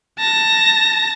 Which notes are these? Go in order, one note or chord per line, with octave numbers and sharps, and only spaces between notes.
A5 A#6